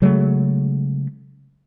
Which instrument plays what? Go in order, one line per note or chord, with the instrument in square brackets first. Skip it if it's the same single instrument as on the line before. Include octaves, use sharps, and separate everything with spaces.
[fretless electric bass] C#3 F#3 G#3 A3